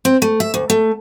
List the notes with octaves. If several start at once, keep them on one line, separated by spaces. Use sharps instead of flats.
C4
A3
E5
D2
A3